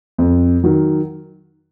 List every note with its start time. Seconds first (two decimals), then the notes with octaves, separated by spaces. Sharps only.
0.18 F2
0.64 D#3 F#3